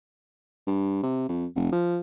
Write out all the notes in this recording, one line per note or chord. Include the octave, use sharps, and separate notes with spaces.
G2
C3
F2
F1
F3